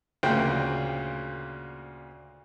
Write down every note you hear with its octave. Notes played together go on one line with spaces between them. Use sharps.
D2 A#2 C#3 A#3 C5 G5